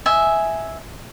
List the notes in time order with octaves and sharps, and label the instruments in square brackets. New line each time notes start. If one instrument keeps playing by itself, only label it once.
[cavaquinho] D#5 E5 G#5